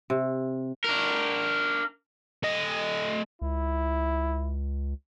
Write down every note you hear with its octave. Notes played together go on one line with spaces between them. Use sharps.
C3
D4 A#4
A3 D#5
C#2 E4